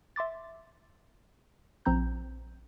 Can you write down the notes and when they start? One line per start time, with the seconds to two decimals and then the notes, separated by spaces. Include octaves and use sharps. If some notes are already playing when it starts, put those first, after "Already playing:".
0.16 E5 C6 D6 A6
1.85 A#1 F3 C4 A#5 G6